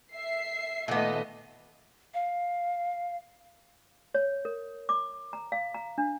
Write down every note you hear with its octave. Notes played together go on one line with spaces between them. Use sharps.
E5 C7
A#2 D#3 A3 B3 D#5
F5
C#5
A#4
D6
A#5
F5
A#5
D4